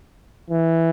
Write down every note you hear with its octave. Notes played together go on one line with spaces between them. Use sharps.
E3